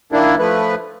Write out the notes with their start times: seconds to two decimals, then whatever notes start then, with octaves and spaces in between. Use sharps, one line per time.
0.12 D#3 A#3 D4 E4
0.39 F3 A3 B4